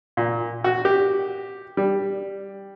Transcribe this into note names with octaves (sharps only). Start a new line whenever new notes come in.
A#2
F#4
G4
G3